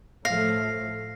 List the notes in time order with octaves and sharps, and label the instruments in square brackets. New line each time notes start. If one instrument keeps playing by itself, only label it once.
[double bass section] A2 F3 A3 [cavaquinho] F5 [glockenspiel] F6 A#6 C7